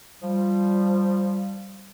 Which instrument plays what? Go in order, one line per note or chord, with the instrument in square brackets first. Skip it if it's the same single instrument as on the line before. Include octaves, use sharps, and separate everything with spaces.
[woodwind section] F3 G3